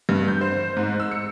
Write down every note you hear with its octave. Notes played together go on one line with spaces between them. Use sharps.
G2
G6
C5
G#2
E6
C#7